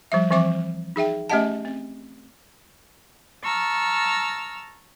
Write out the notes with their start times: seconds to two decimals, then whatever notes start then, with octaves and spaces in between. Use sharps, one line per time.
0.12 F3 G3 E5
0.31 E3 F3 C4 E5 C#6 D6
0.96 D#4 G#4 E5 G5
1.30 A3 C#4 G4 D#5 F#5 A5
1.65 C4
3.43 A5 A#5 C#6 E6 F6